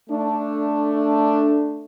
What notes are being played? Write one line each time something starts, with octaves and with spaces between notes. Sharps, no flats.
A3 D4